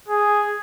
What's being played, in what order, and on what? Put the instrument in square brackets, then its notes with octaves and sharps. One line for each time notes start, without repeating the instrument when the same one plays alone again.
[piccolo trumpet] G#4